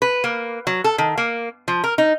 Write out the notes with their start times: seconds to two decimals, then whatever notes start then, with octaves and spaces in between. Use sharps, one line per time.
0.02 B4
0.24 A#3
0.67 F#3
0.84 A4
0.98 D#3
1.18 A#3
1.68 F3
1.84 A#4
1.98 D#4